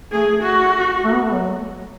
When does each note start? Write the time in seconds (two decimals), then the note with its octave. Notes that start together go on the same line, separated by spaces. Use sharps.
0.12 A3 G#4
0.27 A3
0.43 F#4
1.04 A3
1.13 B3
1.24 A3
1.34 F#3